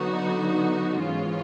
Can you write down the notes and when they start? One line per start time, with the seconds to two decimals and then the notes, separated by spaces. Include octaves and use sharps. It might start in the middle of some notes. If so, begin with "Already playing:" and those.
Already playing: D3 F#3 B3 D#4 F#4
1.03 G#2 E3 G#3 C#4 F4